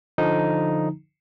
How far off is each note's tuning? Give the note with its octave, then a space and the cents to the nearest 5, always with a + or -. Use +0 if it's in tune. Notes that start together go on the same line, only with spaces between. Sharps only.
D3 +0 F3 +0 D#4 +0